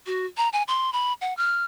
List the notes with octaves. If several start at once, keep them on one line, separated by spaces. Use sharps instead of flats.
F#4
A#5
G#5
C6
B5
F#5
F6